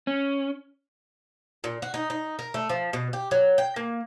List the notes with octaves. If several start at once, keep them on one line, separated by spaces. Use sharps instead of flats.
C#4
A#2
F#4
D#4
D#4
A#4
A3
F3
B2
G4
F#3
G5
A#3